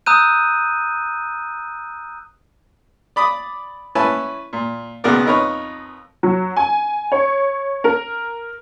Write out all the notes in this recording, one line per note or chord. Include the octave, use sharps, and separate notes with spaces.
A#5 D#6 E6 F#6 G6 D#7
D5 B5 D6 D#6
C#4 E4 B4 G#5 A5
A#2
C#2 B2 G#3 B3 A#4 D5
F2 D#4 A#4 B4 C#5
F#3
G#5
C#5
A#4